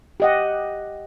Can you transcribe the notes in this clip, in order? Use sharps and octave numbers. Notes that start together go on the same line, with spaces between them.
G4 D#5 F#5